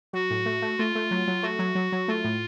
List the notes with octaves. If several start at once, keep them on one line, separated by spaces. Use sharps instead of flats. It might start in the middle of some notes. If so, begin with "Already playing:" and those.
F#3 F#4
A2
A3
A3
A3 F4
A3
F#3
F#3
A3 F#4
F#3
F#3
F#3
A3 F4
A2